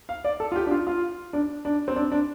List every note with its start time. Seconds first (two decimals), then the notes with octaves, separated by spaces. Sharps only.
0.09 F5
0.25 D5
0.40 A4
0.52 F4
0.56 G4
0.66 D4
0.71 F4
0.87 F4
1.33 D4
1.65 D4
1.88 C4
1.96 D4
2.12 D4